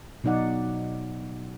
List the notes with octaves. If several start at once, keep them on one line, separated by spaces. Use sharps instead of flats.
B2 F#3 D#4 D5 F#5